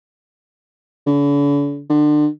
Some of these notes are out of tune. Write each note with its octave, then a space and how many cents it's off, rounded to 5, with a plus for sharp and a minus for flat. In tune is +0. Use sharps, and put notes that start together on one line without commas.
D3 -45
D3 +30